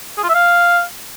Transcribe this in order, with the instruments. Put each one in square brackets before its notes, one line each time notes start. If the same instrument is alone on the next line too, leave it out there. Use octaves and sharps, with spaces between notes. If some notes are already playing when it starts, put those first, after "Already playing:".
[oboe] G#4
F4
E5
F5